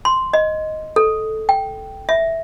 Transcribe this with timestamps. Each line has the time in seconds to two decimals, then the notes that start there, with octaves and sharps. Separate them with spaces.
0.05 C6
0.33 D#5
0.96 A4
1.49 G5
2.09 E5